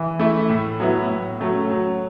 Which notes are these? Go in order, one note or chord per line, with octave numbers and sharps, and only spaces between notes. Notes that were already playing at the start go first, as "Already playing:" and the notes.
Already playing: E3
A3 E4
A2
F#3 B3 E4
A2
F#3 A3 C#4
F#3